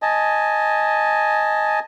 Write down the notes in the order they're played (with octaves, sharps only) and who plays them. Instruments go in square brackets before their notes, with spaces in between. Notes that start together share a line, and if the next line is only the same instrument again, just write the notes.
[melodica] D#5 G#5 A5